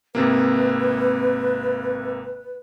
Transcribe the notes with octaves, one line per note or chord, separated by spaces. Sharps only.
G#1 C3 A#3 B4